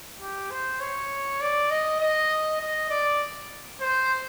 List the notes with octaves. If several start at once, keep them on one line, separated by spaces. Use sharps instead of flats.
G4
C5
C#5
D5
D#5
D#5
D#5
D5
C5